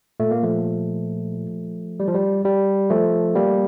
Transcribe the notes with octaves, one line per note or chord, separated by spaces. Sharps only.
A#2 A3
A#3
F3 A3
G3
F3
G3
G3
F3 A3
G3 A#3